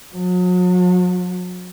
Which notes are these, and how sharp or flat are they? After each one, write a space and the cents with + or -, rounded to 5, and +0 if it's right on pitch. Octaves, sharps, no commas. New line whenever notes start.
F#3 -40